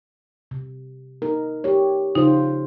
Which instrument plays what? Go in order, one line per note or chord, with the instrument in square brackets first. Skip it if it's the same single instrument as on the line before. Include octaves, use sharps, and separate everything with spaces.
[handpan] C3
D#4 A#4
G4 C#5
[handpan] C#3 F4 C5 [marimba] D#4